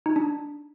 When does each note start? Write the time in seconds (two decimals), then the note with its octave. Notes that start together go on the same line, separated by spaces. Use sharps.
0.06 D#4
0.16 D4